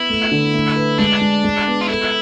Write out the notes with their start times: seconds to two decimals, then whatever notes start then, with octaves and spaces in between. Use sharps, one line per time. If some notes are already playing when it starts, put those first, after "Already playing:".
Already playing: B3 E4
0.10 A3
0.32 D3
0.54 A3
0.76 B4
0.99 G#3 D4
1.21 G#3
1.44 G#3
1.67 B3
1.82 F4
1.89 E4 A4